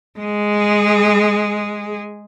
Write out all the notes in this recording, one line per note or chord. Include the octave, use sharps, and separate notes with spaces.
G#3 G#4